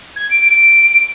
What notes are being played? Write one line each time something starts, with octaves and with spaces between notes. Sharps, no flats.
G#6
D7
D7